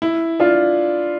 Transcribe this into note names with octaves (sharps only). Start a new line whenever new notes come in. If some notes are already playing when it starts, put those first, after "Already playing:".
E4
D4 F4